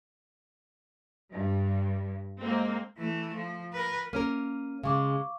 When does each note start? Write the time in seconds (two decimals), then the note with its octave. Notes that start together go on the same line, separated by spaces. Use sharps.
1.32 G2
2.40 G#3 A#3 C4
2.98 E3 A3
3.34 F3
3.73 A#4 B4
4.13 A#3 C#4 A#4 F6 D#7
4.83 C#3 G#3 F5 C#6 D6